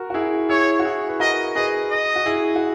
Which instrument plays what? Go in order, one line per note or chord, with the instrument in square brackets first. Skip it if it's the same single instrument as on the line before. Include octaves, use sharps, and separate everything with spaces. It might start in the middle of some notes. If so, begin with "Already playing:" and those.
Already playing: [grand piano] F#4 A#4
F#4
E4 G#4
[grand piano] E4 G#4 [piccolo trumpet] C#5
[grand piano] F#4
E4 G#4
B4
[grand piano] F#4 A#4 [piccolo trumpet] D#5
[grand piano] G#4 B4 [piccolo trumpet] D#5
[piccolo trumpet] D#5
[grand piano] F#4
E4 G#4
F#4